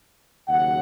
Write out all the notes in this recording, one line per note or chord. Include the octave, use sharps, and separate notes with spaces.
D#2 C#3 F#3 F#5